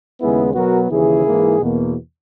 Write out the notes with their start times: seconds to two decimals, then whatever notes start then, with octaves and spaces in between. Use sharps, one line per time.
0.19 D#2 C#3 G#3 B3 E4 G#4
0.54 B2 F#3 B3 F#4 A#4
0.89 D#2 C#3 E3 E4 G#4
1.25 G#2 E3 A#3
1.59 E2 B2 A#3